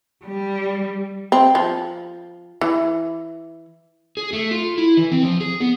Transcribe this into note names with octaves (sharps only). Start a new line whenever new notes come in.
G3
C4
F3
E3
G#4
A3
F4
E4
E3
C4
F3
G#4
B3